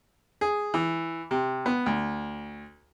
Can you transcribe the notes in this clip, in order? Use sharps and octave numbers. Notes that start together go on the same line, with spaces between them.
G#4
E3
C3
B3
D2